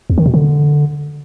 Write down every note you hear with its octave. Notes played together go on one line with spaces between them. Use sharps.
E2
D#3
B2
D3